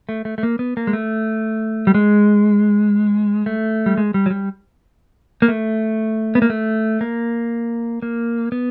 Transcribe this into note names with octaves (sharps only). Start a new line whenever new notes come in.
A3
A3
A3
A#3
B3
A#3
G#3
A3
G3
G#3
A3
G3
G#3
G3
F#3
G3
A#3
A3
B3
A#3
A3
A#3
A#3
B3